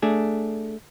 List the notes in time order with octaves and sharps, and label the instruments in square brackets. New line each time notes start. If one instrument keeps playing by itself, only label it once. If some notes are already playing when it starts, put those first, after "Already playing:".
[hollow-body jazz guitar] A3 D4 G#4